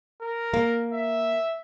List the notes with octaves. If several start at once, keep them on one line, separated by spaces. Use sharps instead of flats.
A#4
A#3
E5